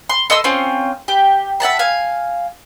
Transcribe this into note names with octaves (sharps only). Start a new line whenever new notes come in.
C6
A4 D#5 C6 E6
C4 C#4 F4
G4
E5 F#5 A5 A#5
F5 G#5